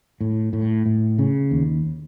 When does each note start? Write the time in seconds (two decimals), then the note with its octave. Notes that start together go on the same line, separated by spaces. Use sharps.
0.21 A2
0.53 A2
0.86 A2
1.19 C#3
1.51 D#2